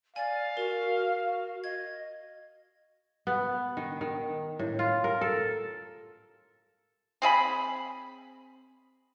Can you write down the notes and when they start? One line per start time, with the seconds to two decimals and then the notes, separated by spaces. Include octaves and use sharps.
0.16 D5 F5 G#5
0.57 F#4 A#4
1.64 D#5 G#6
3.27 B3
3.77 D#3
4.01 D#3
4.59 A2
4.79 F4
5.04 A#4
5.21 A4
7.22 C4 G#4 E5 B5